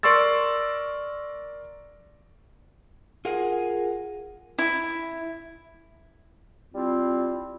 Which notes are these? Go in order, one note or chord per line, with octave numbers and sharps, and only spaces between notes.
A#4 D5 C6 C#6 E6 A6
F4 G#4 A#4 F5 F#5
E4
G3 C4 E4 F4